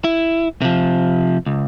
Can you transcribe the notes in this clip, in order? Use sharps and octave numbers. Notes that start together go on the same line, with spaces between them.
E4
C3 F3
C#2